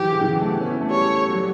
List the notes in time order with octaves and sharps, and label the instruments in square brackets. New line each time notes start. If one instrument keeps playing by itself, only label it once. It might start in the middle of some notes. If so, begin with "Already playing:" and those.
Already playing: [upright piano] E3 F#3 [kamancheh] G4
[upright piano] C#3
E3
F#3
A3
B3
C#4
E4
A3
[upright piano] G3 [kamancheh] C#5
[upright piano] F#3
G3